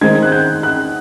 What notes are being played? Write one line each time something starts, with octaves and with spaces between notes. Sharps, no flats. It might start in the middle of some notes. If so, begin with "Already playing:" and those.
D#3 G#3 C4 G#6
F#6
G6
F#6